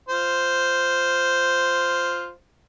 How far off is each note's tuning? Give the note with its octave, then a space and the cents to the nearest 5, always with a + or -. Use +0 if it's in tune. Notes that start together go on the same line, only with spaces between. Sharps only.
F4 +0 C5 -5